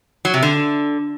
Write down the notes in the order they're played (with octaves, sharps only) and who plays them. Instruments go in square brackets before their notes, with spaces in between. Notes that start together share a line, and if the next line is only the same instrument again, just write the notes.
[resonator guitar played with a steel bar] F#3
C3
D3